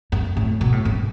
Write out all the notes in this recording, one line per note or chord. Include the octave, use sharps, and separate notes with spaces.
G2
A2
B2
A2
G2